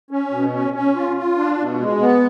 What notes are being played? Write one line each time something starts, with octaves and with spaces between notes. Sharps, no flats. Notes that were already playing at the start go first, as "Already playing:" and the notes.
C#4
B2
C#4
C#4
F4
F4
D4
B2
G#3
B3